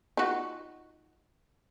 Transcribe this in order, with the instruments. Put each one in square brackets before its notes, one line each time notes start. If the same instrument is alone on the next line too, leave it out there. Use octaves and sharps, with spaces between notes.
[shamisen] D#4 F4 F#4